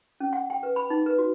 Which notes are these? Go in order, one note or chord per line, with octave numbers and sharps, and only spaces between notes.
C#4
F#5
G5
B4
B5
D#4
B4
F#4